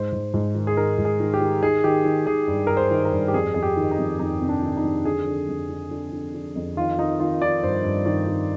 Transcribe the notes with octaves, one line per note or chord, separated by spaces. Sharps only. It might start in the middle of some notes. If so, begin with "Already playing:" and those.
Already playing: G#2 C5
G#2
G#2
D#3
G#4
D#3 A#4
G#2
G#4
D#3
G4
D#3
D#3 G#4
D#3 G4
D#3
D#3 G#4
G2
G2 A#4
C5
D#3
A#4
G2
G4
F2 G#4
F2 G#4
G4
D#3
D#4
F2
F2 D#4
C3
D4
D#3
D#4
F2
D3 G#4
D3
F2
D3
D3
D3
D3
F2
D#3 F4
D#3 D#4
D#3 F4
D#3 D5
G2 C5
G2
D#3 D5
D#3